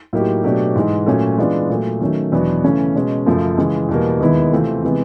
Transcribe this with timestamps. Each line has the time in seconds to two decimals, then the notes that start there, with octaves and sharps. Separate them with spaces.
0.13 A2 F#3 A#3 D#4 G4
0.44 B2 F#3 A3 D4 G4
0.76 G#2 E3 G#3
1.06 A#2 F#3 A3 C#4
1.38 E3 G#3 B3 D4 F4
1.70 A#2 F#3 A3
2.00 D#3 F#3 A3 C#4
2.32 E2 B2 F#3 B3 D4
2.64 C#3 E3 A3 C#4
2.96 B2 G#3 C#4
3.26 F#2 C#3 F3 A3
3.58 C#3 E3 G#3
3.89 E2 B2 G3 A#3
4.20 D#2 D#3 G#3 B3 E4
4.52 C3 E3 A3 C4 F4
4.83 C3 E3 G#3 B3